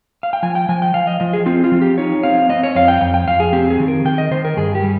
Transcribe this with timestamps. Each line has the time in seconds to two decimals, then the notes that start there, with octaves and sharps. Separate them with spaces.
0.23 F5
0.33 G5
0.43 F3 G#5
0.55 G5
0.69 F3 G#5
0.82 G5
0.94 F3 F5
1.07 D#5
1.20 F3 D#5
1.33 G#4
1.46 C4 F4
1.64 F4
1.72 F3
1.81 G4
1.98 D#4 C#5
2.23 C4 F5
2.49 C4 D#5
2.63 C#5
2.75 F2 F5
2.88 G5
3.01 F2 G5
3.14 G5
3.28 F2 F5
3.40 G#4
3.53 C4 G4
3.70 G#4
3.80 D#3
3.88 A#4
4.05 D#3 G5
4.18 D#5
4.31 D#3 C5
4.45 A#4
4.57 G2 G#4
4.75 G4
4.83 G3